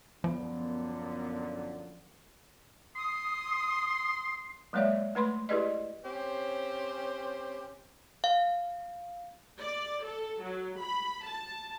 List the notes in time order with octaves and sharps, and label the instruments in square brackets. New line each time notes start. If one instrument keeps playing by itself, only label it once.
[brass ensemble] F#2 A#2 D3 [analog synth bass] F3 [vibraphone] B3
[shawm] C6 [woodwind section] D#6
[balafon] F#3 G#3 A#3 C#5 D5 E5
A3 B4 B5 C6
E4 G4 G#4 B4 D5 D#5
[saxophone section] C4 C#4 G4 C5
[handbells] F5
[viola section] D5
A4
F#3
B5
A5